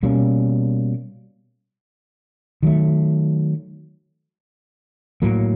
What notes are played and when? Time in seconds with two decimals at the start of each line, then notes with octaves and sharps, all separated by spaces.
0.03 B2 G3 A#3 C#4
2.63 D#3 F#3 A3
5.22 A2 F#3 A#3